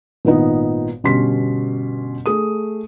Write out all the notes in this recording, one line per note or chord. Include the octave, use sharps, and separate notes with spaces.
G#1 A#2 B3 D#4
G1 B2 C#4 G4 C6 B6
A3 G#4 D#6